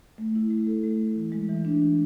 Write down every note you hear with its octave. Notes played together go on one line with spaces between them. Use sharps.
A3
E4
A3
A4
A3
E4
E3
G#3
E3
D4
E3